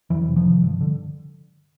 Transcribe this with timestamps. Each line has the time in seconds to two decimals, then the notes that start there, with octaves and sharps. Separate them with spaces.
0.10 F2 E3 F#3
0.28 C3
0.36 D#3 F3
0.46 C3
0.63 G2
0.81 D3